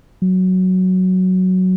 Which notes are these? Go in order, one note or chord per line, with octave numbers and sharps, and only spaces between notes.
F#3